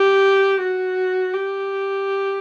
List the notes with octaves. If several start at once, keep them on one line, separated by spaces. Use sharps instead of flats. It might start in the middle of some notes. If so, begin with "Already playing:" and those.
Already playing: G4
F#4
G4